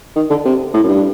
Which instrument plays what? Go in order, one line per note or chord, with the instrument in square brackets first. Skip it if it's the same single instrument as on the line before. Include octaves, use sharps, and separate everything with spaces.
[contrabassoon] D#3
D3
C3
A2
F#2
G2